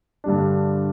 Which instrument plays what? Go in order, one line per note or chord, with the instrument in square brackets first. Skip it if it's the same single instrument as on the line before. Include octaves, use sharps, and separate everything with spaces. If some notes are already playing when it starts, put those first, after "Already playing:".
[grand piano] G2 D3 G3 D4